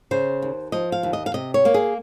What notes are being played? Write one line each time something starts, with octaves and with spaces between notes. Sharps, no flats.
C#3 C5
D#2
F3 D#5
F5
D#2
D#5
F5
C3 D#5
C#5
A#3
G#4